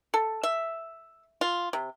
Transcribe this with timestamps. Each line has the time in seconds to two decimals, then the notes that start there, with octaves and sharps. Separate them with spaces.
0.14 A4
0.43 E5
1.41 F4
1.73 C3